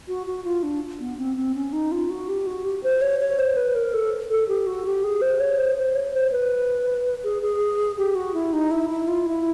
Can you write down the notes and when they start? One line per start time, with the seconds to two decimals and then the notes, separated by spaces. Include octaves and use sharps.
0.08 F#4
0.27 F#4
0.45 F4
0.63 D4
1.00 B3
1.18 C4
1.36 C4
1.55 C#4
1.73 D#4
1.92 F4
2.10 F#4
2.28 G4
2.47 F#4
2.65 G4
2.83 C5
3.02 C#5
3.20 C#5
3.39 C5
3.57 B4
3.75 A#4
3.93 A4
4.30 A4
4.48 G4
4.67 F#4
4.85 G4
5.04 G#4
5.22 C5
5.40 C#5
5.59 C5
5.77 C5
5.95 C#5
6.14 C5
6.32 B4
7.24 G#4
7.43 G#4
7.97 G4
8.15 F#4
8.34 E4
8.53 D#4
8.71 E4
8.90 E4
9.08 F4
9.26 E4